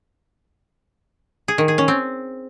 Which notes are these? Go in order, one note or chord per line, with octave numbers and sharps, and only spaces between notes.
G#4
D#3
G#4
C#4
C4